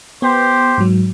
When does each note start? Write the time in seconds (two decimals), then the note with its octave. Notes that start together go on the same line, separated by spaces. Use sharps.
0.22 B3 G4 C5
0.78 G#2 F#3